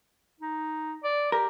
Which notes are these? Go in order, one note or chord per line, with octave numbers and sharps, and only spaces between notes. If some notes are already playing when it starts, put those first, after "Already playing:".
D#4
D5
G4 A#4